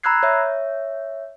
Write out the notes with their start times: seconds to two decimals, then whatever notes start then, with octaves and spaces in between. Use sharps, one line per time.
0.03 A#5 B5 E6 F#6 G#6 C7
0.23 C#5 E5